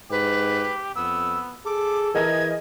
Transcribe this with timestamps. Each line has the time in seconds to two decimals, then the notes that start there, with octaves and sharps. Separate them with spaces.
0.11 G#2 G4 B4
0.95 F2 B3 E6
1.66 G#4 A4 D6
2.14 E3 G#4 A#4 D#5 G#6